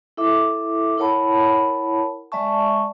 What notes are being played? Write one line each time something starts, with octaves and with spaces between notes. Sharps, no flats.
E4 A4 E5 D6
E4 A#4 C#5 F#5 A5 B5
G#3 D5 E5 A5 C#6